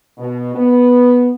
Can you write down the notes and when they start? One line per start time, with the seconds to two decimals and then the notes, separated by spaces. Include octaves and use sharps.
0.18 B2
0.54 B3